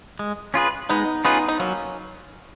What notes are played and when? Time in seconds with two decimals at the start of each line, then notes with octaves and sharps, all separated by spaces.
0.19 G#3
0.54 C#4 F4 G#4 B4
0.89 G#3 B3 D#4
1.24 B3 C#4 D#4 F4 G#4 B4
1.48 D#4
1.59 F#3 A#3 C#4